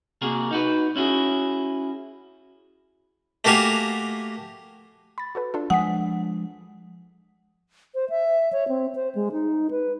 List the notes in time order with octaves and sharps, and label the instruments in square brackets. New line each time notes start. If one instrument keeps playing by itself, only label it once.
[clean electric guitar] C3 A#3 F#4 G#4 A#4
D#4 F#4 B4
C#4 E4 F#4 G#4
[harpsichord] A3 A#3 F#4 G4 F5 G#5
[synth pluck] B5 A6
F#4 A4 B4
D4 F4 A4
[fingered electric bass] F3 G#3 D4 [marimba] F#5 G#5 [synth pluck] D#6 B6
[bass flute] C5
E5
C#5
C4
C5
G#3
D#4
B4